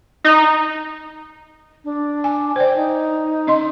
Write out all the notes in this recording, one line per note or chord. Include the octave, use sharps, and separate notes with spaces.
D#4
D4
G#5
C5 D5 G5
D#4
C#4 D#5 C6